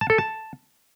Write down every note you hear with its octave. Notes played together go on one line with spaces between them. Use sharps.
A5
A4
A5